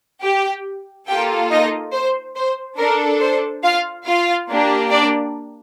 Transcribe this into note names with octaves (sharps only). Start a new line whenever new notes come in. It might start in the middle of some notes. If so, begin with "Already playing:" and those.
G4 G5
A#3 F4 G4 A4 G5
D#4 D#5
C5
C5
D4 A4 A#4
C5
F4 F5
F4 F5
A#3 D4 G4
D4 D5